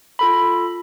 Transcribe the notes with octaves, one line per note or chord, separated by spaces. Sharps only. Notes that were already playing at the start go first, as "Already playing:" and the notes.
F4 A4 B5